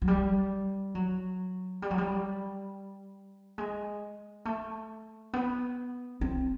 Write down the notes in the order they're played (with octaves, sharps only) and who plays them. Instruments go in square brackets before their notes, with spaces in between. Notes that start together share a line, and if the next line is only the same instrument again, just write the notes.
[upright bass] F#3
G3
F#3
G3
F#3
G3
G#3
A3
B3
C4